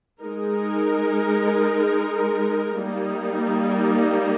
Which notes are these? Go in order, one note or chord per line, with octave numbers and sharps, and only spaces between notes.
G#3 D#4 A#4
G3 A#3 D#4